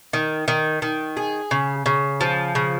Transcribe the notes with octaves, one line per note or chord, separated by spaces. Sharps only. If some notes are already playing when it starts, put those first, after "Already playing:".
D#3
D#3
D#3
G#4
C#3
C#3
F3
C#3